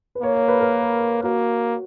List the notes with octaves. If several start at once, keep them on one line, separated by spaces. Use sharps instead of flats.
B4
A#3 C#5
C#5
B4
A#4
A#3 F#4